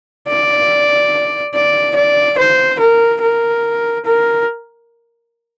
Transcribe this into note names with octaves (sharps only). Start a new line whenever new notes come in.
D5
D5
D5
C5
A#4
A#4
A#4